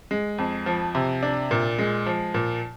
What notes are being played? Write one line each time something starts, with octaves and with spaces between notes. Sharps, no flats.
G#3
F2
F3
C3
D4
A#2
G#3
F3
A#2